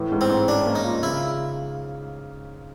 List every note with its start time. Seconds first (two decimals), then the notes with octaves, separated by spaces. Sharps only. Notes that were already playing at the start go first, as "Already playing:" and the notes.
Already playing: A2 E3
0.12 G#2
0.21 C4
0.29 G#2
0.48 C#4 D4
0.66 A#3
0.75 D#4
0.84 F4
1.03 C#3 E4